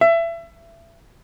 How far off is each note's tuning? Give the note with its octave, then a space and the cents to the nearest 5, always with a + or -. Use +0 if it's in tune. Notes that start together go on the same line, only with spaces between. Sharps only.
E5 +25